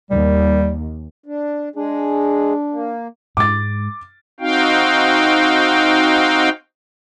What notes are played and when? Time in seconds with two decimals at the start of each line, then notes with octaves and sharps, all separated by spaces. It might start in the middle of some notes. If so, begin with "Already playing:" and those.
0.10 D#2 G3
1.26 D4
1.76 G#3 D4 G#4
2.72 A#3
3.37 G#2 G#3 D6 A6
4.40 C4 D#4 F#4 F5 G5